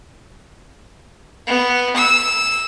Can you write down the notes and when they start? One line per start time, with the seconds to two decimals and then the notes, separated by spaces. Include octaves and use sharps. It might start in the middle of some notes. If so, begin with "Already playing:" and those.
1.47 B3
1.96 E6